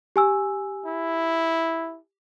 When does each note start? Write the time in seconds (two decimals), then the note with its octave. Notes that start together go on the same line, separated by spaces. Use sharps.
0.16 G4 G#5 E6
0.86 E4